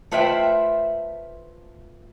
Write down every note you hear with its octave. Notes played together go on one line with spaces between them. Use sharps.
A3 F4 B4 C5 E5 G5